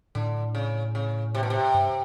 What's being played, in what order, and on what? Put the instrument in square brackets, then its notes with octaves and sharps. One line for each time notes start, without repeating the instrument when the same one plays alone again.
[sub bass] A2 [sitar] D3
[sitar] C#3
C#3
C3
B2
C3
[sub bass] G2